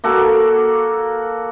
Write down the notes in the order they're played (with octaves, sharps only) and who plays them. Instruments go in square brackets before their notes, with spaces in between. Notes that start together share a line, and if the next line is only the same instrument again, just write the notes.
[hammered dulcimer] A#3 F#4 A4